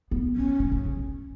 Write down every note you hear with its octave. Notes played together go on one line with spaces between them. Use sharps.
B3
C#4
C#3
C#3